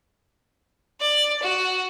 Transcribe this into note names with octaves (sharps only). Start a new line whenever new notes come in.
D5
F#4